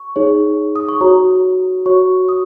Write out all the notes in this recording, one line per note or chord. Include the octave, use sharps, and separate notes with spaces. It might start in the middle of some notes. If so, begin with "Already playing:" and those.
Already playing: C#6
D#4 G#4 C#5
D#6
C#6
F#4 C#5 A#5
F#4 C#5 C#6
D#6